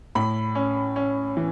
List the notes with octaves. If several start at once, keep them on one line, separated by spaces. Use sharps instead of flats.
A2 B5
C#4
C#4
E3